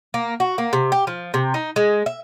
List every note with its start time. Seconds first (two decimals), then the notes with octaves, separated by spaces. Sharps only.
0.14 A#3
0.40 F#4
0.58 A#3
0.73 C3
0.92 G4
1.07 F3
1.34 C3
1.54 D#4
1.76 G#3
2.06 E5